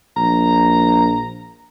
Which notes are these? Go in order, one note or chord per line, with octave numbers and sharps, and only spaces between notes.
A#1 A#5